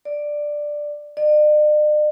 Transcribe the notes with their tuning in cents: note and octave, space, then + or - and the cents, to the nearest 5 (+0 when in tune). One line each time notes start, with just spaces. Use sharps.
D5 +5
D5 +45